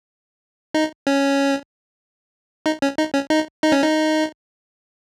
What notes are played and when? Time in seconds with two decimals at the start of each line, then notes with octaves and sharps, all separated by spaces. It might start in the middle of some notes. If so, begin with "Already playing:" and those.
0.74 D#4
1.07 C#4
2.66 D#4
2.82 C#4
2.98 D#4
3.14 C#4
3.30 D#4
3.63 D#4
3.72 C#4
3.82 D#4